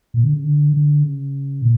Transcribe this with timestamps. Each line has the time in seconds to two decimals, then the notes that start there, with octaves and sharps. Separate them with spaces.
0.14 A#2
0.24 D3
0.33 C#3
0.44 D3
0.74 D3
1.03 C#3
1.62 A#2